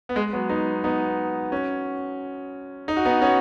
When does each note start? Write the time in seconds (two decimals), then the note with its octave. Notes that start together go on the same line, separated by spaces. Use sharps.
0.09 B3
0.16 G#3
0.33 F#3 B3
0.50 B3 D#4
0.84 B3 D#4
1.52 C#4 F#4
2.88 D#4
2.97 F#4
3.05 B3 D#4
3.22 C#4 F#4